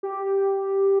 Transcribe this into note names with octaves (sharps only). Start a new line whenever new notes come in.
G4